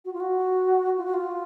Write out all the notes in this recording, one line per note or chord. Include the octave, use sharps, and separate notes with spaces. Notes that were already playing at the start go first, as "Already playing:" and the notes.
F#4
F4
F#4
F4
F#4
F4